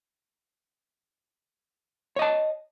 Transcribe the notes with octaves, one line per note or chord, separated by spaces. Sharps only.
C#5 D#5 A5